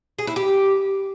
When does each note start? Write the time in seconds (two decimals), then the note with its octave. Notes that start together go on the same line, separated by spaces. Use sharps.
0.19 G#4
0.27 E4
0.36 G4